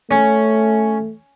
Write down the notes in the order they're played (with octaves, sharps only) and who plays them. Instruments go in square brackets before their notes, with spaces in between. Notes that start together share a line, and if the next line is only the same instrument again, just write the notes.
[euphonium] A3 [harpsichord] C#4